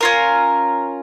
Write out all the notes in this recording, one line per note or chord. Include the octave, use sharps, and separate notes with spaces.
C#4 F4 A#4